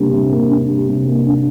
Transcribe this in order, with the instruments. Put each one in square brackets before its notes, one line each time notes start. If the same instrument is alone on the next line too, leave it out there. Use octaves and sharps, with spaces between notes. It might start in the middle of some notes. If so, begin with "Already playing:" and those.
Already playing: [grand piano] C3 G3 A#3 D4
C3
A#3
D4
G3
C3
A#3
D4